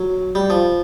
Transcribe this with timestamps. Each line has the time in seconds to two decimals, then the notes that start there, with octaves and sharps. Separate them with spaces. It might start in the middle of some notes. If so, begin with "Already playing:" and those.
Already playing: F#3
0.35 G3
0.50 F3